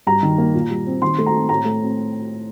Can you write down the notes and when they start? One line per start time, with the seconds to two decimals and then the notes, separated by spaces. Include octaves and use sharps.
0.07 G2 A#5
0.23 D#3
0.38 A#3
0.54 A#2
0.70 G3
0.86 C4
1.02 D#3 C6
1.19 A3
1.26 A#5
1.34 C4
1.49 A2 A#5
1.65 A3
1.81 C4